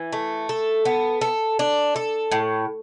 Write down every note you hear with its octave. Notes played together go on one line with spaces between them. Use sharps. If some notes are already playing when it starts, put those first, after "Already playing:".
Already playing: E3
A3
A4
B3
A4
D4
A4
A2